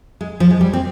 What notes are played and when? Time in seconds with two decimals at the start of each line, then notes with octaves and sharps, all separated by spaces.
0.21 G#3
0.40 F3
0.50 G#3
0.61 G3
0.73 C4